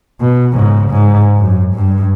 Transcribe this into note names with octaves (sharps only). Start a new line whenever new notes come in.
B2
G#2 C#3
G#2
F#2
G2